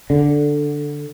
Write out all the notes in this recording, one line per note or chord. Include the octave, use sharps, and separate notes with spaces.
D3